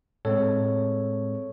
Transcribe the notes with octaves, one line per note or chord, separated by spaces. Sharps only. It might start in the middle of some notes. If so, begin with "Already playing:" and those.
A2 G#3 C4 A4 C#5